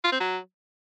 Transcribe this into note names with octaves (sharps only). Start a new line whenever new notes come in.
F4
C4
F#3